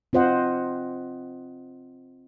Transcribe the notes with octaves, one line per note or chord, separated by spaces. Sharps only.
C4 F4 C5 D#5 F#5